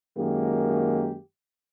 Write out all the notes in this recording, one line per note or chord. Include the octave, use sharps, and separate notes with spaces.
F#2 D#3 G#3 A#3 G4